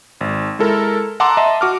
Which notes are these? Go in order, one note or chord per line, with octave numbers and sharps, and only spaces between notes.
G#1
G#3 E4 A4 A#4
F#5 A5 A#5 C6 D6 E6
D#5 E5 A5 C6
F#4 D6 F6